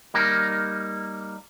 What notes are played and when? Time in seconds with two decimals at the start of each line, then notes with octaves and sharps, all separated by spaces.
0.14 G3 A#3 D#4 A#4